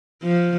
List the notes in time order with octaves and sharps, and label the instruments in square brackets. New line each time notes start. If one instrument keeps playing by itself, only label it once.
[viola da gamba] F3